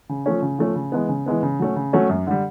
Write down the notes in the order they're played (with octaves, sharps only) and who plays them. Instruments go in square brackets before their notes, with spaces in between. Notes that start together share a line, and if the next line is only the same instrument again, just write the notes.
[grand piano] C#3
F3 A3 C#4
C#3
F3 A3 C#4
C#3
E3 G#3 B3
C#3
E3 G#3 B3
C#3
F#3 A3 C#4
C#3
F#3 A3 C#4
F#2
D3 G3